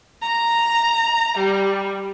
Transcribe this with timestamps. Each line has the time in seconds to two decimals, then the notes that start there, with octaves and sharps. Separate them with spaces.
0.22 A#5
1.38 G3